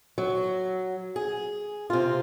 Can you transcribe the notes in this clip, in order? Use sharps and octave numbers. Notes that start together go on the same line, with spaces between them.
F#3
G#4
C3 F4